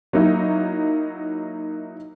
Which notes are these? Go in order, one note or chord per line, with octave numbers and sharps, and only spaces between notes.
F#3 A#3 D#4 E4 F#4